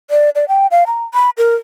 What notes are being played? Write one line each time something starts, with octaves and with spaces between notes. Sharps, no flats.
D5
D5
G5
F5
A#5
B5
A#4